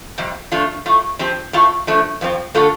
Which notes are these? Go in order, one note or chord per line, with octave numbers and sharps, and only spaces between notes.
F2 C3 G3
F3 A3 D4 F4
A2 A3 F4
F3 C4 G4
A2 A3 F4 A4
F3 A3 D4
F2 F3 C4
D3 A3 F4 A4